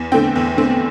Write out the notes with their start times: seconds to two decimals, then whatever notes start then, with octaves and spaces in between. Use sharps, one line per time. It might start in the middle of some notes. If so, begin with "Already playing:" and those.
Already playing: E2
0.12 D3 A3 C4 G5
0.36 E2
0.57 D3 A3 C4